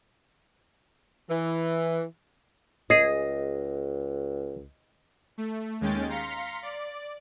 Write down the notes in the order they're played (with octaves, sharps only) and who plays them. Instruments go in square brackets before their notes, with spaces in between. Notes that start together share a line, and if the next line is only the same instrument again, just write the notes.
[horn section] E3
[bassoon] C#2 [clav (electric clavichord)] G#4 [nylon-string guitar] D#5
[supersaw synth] A3
D#2 G#3 C#4 G5 A6
F5 A#5 C6 B6 C#7
D5